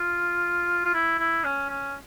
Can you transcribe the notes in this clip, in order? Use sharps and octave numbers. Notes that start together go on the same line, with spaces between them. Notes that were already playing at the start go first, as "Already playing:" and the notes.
Already playing: F4
F4
E4
E4
C#4
C#4